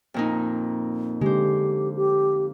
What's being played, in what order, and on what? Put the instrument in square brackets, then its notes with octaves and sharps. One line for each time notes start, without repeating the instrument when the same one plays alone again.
[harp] F2 A#2 D#4
[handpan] D3 [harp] G#3 C5 [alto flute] G4
[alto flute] G4